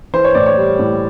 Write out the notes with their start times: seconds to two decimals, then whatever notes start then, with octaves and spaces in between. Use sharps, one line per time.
0.13 E3 C5
0.24 C#5
0.35 A2 D5
0.46 C#5
0.57 G3
0.79 A2